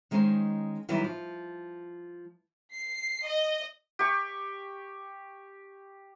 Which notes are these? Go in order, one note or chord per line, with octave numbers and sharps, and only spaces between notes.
D#3 G#3 C#4 D#4 C5
D#3 E3 F#3 G3 B3 E4
F3
C7
D#5
G4 C#6